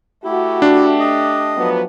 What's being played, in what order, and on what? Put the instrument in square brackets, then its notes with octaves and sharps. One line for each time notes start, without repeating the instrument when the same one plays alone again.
[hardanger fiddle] A3 G4 [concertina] E4 [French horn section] F#4
[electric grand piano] D4
[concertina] D#5
[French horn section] F3 F#3 B3